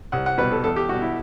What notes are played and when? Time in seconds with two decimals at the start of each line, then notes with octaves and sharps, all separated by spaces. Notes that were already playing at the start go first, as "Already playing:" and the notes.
0.12 C2 F#5
0.26 F#5
0.38 B2 G3 B4
0.52 A4
0.64 E2 A4
0.76 G4
0.89 B2 G3 F#4
1.02 E4